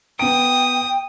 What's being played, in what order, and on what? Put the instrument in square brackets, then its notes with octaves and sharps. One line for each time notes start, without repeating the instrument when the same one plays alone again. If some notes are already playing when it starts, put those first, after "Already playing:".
[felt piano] B3 D7 [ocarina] G5 [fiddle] D#6